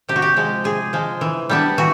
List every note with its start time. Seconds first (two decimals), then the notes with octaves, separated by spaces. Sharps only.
0.09 C3 G4
0.16 F#4
0.22 G4
0.36 F3 G#3
0.64 C3 G#4
0.93 F3 G#3
1.21 E3
1.49 G3 B3 D4
1.78 E3 F#4